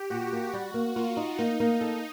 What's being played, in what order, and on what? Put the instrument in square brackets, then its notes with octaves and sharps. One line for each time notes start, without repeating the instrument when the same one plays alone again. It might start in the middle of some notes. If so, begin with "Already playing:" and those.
Already playing: [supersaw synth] G4
[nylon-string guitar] A#2 [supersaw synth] F#4
[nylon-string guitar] A#3
G3
A#3
[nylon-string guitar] A#3 [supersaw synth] F4
[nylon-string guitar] D#4
[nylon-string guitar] A#3 [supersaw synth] D#4
[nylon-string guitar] A#3
A4